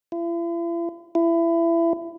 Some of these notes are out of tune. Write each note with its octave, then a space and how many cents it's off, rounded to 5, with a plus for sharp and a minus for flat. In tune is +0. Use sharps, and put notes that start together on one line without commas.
E4 +45
E4 +25